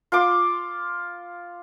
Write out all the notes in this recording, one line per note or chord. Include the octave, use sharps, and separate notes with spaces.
F4 C6 D6